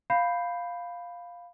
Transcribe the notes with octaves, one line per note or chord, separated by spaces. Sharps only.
F5 B5 G6 C7